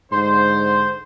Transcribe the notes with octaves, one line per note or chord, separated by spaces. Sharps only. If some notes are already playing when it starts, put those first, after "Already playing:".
G#2 D3 C5 C6